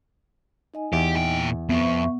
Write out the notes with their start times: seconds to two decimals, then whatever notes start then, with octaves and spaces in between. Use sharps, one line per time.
0.74 D#4 D#5 G#5
0.93 E2 G4
1.16 A#2 G5
1.69 F2 B3 C4 E5 C#6